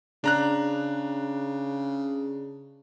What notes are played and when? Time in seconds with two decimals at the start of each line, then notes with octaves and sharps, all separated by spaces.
0.24 C#3 D4 A#5 F#6